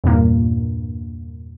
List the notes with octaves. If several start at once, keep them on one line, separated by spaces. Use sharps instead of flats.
E2 G2 A#2 A#3